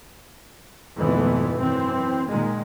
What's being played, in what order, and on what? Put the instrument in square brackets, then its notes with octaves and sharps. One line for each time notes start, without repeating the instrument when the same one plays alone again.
[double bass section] G#1 F2 B2 E3 A3 B3
F#2 E3 C4
A#2 D#3 G#3